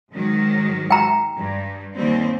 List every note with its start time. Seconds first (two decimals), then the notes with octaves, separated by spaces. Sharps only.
0.12 G#2 D#3 F#3
0.90 G5 A#5
1.38 G2
1.94 D#2 G3 C4